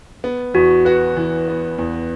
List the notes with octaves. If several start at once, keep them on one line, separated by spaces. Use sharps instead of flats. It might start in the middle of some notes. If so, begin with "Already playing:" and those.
B3
E2 F#4
F#4 B4
E3
B3
E2